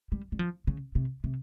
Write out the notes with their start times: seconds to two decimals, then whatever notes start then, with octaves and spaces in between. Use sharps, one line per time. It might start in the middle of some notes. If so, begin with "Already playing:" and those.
0.12 G3
0.32 G3
0.39 F3
0.67 C#3
0.95 C3
1.24 C3